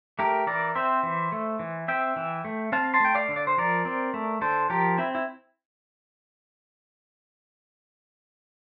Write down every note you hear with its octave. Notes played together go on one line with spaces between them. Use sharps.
A3 G4 A#4
E3 A#4 D5
C4 C5 E5
E3
A3
E3
C4 E5 G5
E3
A3
C4 F5 A5
A5 C6
A3 G5
D5 F5
D3
D5
C5
F3 A#4 D5
C4
A3
D3 A4 C5
F3 G4 A#4
C4 E4
E4